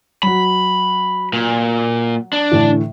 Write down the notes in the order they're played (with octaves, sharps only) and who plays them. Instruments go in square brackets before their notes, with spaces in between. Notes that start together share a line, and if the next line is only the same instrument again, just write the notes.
[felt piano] F#3 F#4 [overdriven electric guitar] B5
[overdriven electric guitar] A#2
D4
[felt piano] A2 D3 E3